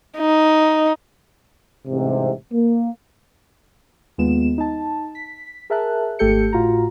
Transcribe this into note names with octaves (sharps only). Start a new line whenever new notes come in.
D#4
A1 G#2 C3
A#3
D#2 G#3 B3 F4 E7
D#4 A5
B6
G#4 A#4 E5 A5 F#6
G#1 A3 G4 A4 G6 C#7
A2 F4 F#4 A#5